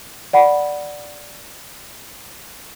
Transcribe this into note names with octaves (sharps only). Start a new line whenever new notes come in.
D5 F#5 B5